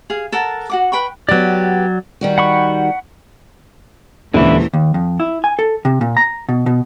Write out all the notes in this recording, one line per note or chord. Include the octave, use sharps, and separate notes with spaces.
G#4 F5
A4 A#4 F#5 A5
F#4 F#5 D6
B4 G5 B5 C#6
F#3 B3 G4 D5
D#3 G3 F#4
F#5 B5 C#6
D#1 C#2 D3 E3 E4
D#2
F2
E4
G#5
A4
C3
A#2
A#5
B2
B2